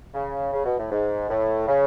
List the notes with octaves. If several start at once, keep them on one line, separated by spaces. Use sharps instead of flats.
C#3
C#3
B2
A2
G#2
A2
C#3